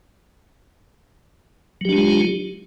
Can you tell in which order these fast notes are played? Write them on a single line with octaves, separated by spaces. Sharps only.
F#3 G4 D4 G#3 F4